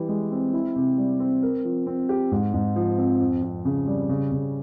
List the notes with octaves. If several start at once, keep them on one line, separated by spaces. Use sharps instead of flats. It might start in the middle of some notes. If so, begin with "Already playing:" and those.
Already playing: E3 G3 G4
G#3
C4
E4
C3
G3
C4
A#4
F3
C4
G4
G#2
G#2
F3
C4
F2
F2
C#3
G3
C#3
C#3